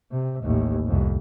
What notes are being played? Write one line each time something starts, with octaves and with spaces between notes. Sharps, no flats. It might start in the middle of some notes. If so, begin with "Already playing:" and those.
C3
A1 D#2
C2 F2